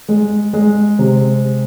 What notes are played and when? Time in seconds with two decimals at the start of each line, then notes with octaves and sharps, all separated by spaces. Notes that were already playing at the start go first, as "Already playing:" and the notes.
0.08 G#3
0.53 G#3
0.99 C3